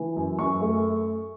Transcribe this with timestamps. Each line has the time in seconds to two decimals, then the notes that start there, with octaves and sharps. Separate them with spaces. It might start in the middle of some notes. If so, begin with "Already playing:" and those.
Already playing: E3
0.16 F#2
0.39 F#2 C#6
0.61 A3